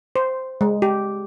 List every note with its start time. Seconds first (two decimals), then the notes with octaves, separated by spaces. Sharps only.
0.16 C5
0.61 G#3
0.82 G4